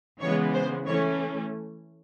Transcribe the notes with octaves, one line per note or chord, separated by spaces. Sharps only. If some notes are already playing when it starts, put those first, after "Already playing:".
C#3 E3 G#3 B3 C#5
C5
E3 A3 C#4 C#5